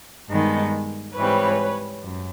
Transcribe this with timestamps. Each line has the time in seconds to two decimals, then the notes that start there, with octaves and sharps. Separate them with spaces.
0.29 G2 D#3 G#3 B3 D#4
1.15 G#2 E3 G3 C4 B4 C#5
2.02 F#2